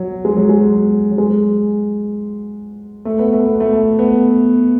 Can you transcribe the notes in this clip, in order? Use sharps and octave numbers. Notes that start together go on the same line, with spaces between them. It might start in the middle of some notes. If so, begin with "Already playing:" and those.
Already playing: F#3
G#3
F#3
G#3
F#3
G#3
A3
B3
A3
B3
A3
B3